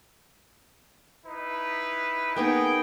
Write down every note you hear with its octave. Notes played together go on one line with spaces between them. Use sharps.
D#4 E4 B4
A#3 B3 D#4 G#4 G5